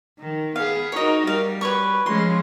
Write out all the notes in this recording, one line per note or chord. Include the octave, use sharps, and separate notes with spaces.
D#3
B3 G#4 F5
D#4 F#4 A#4 C#5 D#5
G3 F5
B4 C#5 C#6
F3 G#3 C#4 C6